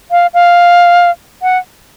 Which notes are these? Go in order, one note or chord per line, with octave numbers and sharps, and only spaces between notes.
F5
F5
F#5